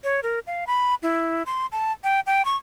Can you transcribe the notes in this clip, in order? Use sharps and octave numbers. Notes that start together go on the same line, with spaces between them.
C#5
A#4
F5
B5
E4
C6
A5
G5
G5
C#6